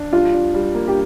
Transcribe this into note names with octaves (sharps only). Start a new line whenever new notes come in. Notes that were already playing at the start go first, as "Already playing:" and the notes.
Already playing: D4
G3 F4
D4
G3
A#3
G4